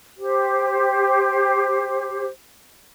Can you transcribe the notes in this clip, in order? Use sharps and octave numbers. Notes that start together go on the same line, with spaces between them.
G4 C5